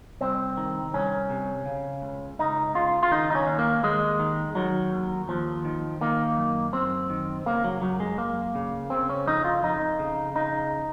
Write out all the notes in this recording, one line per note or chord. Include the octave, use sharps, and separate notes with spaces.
C2 C4
D#3
C2 C#4
C3
C#3
C#2
C#2 D#4
C#3 F4
F4
D#3 D#4
D#4
C#4
D#2
A#3
D#2 G#3
D#3
D#3 F#3
D#2
D#2 F3
D#3
D#3 A#3
F#2
F#2 C4
D#3
C#3 A#3
F#3
F#2 F#3
G#3
F#2 A#3
C#3
C#3 C4
C#4
F2 D#4
F4
F2 D#4
C#3
C#3 D#4